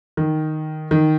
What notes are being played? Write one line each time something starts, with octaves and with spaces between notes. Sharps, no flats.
D#3
D#3